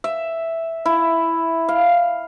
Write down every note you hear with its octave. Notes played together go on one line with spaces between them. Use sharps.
E5
E4
F5